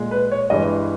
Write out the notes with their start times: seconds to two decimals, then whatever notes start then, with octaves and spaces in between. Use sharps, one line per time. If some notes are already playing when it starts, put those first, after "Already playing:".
Already playing: A#2 G#3
0.11 B4
0.31 C#5
0.50 G2 E3 G#3 D#5